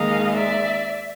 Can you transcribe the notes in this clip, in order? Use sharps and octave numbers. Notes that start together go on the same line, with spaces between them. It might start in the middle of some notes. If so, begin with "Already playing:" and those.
Already playing: D#2 D#3 G#3 D#5 F5
D5 E5